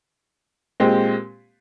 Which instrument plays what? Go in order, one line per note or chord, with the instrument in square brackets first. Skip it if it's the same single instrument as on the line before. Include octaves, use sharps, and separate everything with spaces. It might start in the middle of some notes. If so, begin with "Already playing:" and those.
[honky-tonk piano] A#2 G#3 C4 G4